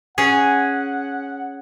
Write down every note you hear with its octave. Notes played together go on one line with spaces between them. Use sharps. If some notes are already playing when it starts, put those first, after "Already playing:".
C#4 G#4 F#5